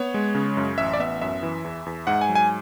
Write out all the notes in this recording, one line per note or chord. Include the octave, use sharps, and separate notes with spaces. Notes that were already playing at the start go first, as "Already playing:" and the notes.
Already playing: B3 C#5
G#3
C#3
F#2
A1 E5
D5
B3 E5
F#2 E5
E3
E2
E2
G#2 F#5
G#5
F#3
G#5